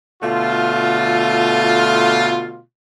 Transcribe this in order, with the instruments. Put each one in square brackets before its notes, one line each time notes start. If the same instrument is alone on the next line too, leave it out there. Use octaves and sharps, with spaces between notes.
[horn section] B2 D3 A3 F4